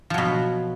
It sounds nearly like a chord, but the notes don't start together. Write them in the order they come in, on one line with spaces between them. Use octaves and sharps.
F3 F#3 B2